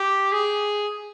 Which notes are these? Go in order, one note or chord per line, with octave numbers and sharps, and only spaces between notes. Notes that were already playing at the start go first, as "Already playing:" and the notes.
Already playing: G4
G#4